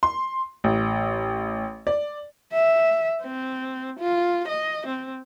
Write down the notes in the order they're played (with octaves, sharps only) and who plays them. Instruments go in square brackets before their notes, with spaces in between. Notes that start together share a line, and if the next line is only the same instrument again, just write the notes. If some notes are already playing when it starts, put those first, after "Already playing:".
[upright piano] C6
A1
D5
[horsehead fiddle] E5
C4
F4
D#5
C4